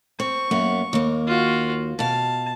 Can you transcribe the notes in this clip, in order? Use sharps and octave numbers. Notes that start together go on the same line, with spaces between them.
C4 C#6
F#2 A#3 B3
D#2 A#3
F4 F#4
B2 F5 A5